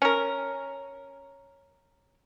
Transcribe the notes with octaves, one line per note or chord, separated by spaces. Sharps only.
C#4 A#4